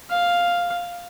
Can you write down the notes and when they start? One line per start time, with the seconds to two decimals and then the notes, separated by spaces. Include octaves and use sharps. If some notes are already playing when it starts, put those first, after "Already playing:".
0.11 F5